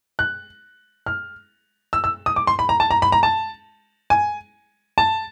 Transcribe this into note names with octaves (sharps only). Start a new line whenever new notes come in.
F#6
F6
E6
E6
D#6
D6
C6
B5
A#5
A5
A#5
B5
A#5
A5
G#5
A5